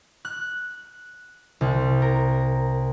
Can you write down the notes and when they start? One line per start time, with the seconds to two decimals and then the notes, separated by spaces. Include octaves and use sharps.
0.25 F#6
1.61 C2
2.02 A#4